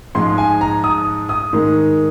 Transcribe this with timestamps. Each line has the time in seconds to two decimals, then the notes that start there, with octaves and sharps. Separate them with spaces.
0.15 G#2 F3 G#3 C6
0.38 G#5
0.61 A#5
0.84 D#6
1.29 D#6
1.53 G#2 D#3 G#3